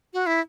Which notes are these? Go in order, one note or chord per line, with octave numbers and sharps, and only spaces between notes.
F#4
E4